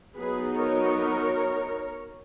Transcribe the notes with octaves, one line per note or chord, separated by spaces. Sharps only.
F#3 B3 D#4 G#4 B4
A#4 C#5